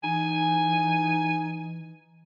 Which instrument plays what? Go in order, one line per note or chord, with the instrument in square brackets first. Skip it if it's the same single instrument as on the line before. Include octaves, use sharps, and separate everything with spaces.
[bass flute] E3 [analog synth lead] D#4 [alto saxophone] G#5